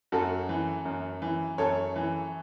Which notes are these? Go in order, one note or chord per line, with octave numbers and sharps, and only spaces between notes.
F#2 F#4 A4
E3
F#2
E3
F#2 A4 C#5
E3